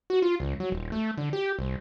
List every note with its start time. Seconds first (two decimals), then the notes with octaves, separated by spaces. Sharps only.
0.10 F#4
0.22 F4
0.40 C#2
0.60 F#3
0.72 D#1
0.92 A3
1.18 D3
1.33 G4
1.59 C2